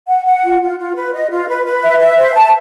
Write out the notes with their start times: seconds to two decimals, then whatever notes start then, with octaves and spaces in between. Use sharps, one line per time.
0.08 F#5
0.26 F#5
0.43 F4
0.61 F4
0.78 F4
0.95 B4
1.13 D#5
1.30 F4
1.48 B4
1.65 B4
1.82 E5
1.99 E5
2.17 C5
2.34 A5